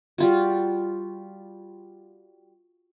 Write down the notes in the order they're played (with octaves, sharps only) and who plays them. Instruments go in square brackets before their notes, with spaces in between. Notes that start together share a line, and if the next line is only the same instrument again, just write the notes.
[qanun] G3 F4 F#4